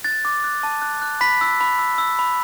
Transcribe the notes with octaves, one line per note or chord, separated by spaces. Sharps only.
F#6 A6
D6
F#6
A5
F#6
F#6
B5 B6
E6
B5
E6
E6
B5